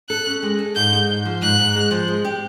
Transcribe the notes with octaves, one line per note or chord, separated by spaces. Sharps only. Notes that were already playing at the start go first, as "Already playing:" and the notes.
A4 F#6
C#4
G#3
A4
G#2 G6
G#3
G#2
F3
G#2 F#6
G#2
G#3
F3
G#3
G4